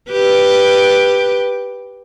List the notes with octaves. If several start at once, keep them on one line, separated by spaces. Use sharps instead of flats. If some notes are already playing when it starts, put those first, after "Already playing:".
G4 B4